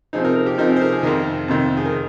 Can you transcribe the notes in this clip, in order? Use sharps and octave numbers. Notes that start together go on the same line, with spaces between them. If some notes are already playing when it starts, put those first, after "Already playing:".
C3 F3 C4 D#4 G#4
A#4
A#4
G4
C3 F3 C4 D#4 A#4
G#4
C5
A#4
G#4
F2 C3 D#3 A#4
F2 C3 D#3
G#4
A#4